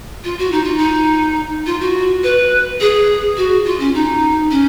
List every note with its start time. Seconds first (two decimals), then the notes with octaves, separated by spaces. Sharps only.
0.24 F4
0.38 F#4
0.52 D#4
0.64 F4
0.77 D#4
1.66 F4
1.80 F#4
2.23 B4
2.80 G#4
3.37 F#4
3.65 F4
3.79 C#4
3.94 D#4
4.51 C#4